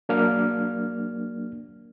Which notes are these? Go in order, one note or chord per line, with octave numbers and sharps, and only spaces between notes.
F#3 A#3 D4 F6